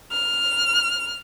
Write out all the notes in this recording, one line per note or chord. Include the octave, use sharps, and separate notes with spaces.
F6